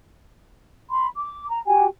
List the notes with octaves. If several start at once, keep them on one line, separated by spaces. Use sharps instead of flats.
B5 C6
D6
A#5
F#4 G4 G5 G#5